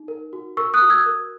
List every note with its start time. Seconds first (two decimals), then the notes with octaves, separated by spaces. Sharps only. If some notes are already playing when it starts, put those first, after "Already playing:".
Already playing: D#4
0.08 A#4
0.33 F#4
0.57 A#4 C#6 E6
0.74 D#6 F#6
0.82 F#4
0.90 E6 G#6
1.06 A#4